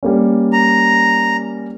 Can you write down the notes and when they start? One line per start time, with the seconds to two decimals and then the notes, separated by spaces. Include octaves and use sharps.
0.03 G3 A#3 C#4
0.53 A#5